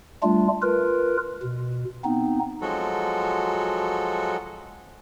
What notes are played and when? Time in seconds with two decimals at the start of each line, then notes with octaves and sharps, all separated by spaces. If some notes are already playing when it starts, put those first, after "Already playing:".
0.23 G3 A3 D4 F4
0.62 F4 A#4 B4
1.42 B2
2.04 B3 C4 D#4
2.61 F3 F#3 G#3 F#4 A4